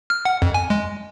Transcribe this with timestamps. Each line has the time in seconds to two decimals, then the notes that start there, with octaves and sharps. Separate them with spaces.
0.10 F6
0.25 F#5
0.42 F2
0.54 G#5
0.70 G#3